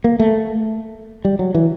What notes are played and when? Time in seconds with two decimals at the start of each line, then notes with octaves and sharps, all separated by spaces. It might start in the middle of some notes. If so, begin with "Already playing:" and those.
0.04 A#3
0.20 A3
1.25 G3
1.39 F#3
1.55 E3